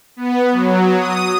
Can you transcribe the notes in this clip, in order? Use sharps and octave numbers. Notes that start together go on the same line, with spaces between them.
B3
F#3
D#6